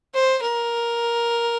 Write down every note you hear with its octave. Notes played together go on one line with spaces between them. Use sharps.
C5
A#4